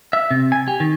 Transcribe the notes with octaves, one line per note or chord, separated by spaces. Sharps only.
E5
C3
G#5
G4
D#3